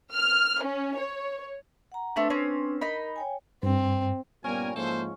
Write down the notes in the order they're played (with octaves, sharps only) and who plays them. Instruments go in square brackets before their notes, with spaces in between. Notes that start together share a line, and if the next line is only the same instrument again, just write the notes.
[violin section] F6
C#4
C#5
[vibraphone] F#5 A#5
[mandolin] A3 C4 A5 [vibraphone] D4 B4 C6
[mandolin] C4 C#4
[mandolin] D#4 B5 [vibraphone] A#4
[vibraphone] C#5 G5 G#5
[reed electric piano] G2 [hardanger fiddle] C4
[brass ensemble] G2 A#2 G3 [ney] B3 [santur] C#4 [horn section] A#4 G#5
[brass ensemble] G#2 F3 [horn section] E3 A4 C5 [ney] A#3